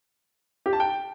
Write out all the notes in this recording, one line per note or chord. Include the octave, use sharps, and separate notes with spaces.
G4
A5
G5